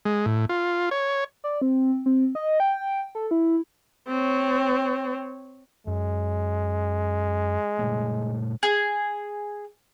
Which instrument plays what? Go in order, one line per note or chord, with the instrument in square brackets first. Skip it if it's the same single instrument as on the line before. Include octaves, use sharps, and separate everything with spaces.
[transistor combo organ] G#3
A2
F4
C#5
[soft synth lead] D5
C4
C4
D#5
G5
A4
E4
[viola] C4 C#5
[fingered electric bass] F#2 [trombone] G#3
[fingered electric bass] A#2 G3 A3
[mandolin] G#4